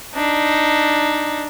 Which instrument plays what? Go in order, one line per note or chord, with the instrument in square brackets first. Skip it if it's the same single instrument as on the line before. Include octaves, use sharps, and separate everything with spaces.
[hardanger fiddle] D4 D#4